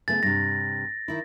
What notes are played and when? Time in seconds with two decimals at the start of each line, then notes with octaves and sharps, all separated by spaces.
0.08 C#3 A3 B3 A6
0.23 G2 C3 A#6
1.08 D#3 E4